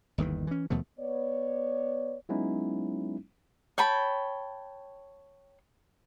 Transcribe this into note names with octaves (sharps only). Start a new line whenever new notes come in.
G1 D#2 D#3 E3
E3 C#4
D#2 B2 F3 A3
B3 C#5 D5
F#3 G#3 B3 C#4 D#4 E4
C#5 G5 A5 B5